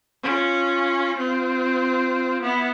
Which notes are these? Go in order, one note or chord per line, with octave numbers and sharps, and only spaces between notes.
C#4 F4
C4 F4
B3 E4